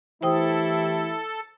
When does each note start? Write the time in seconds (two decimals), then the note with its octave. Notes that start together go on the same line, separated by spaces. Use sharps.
0.23 E3 A3 E4 G4 A4 C5 G5 D#6